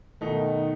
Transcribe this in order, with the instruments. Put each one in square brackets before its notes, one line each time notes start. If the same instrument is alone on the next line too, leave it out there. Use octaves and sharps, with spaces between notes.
[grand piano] B2 A3 D#4 [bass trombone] D#3